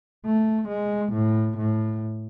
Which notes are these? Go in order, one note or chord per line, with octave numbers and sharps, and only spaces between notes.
A3
G#3
A2
A2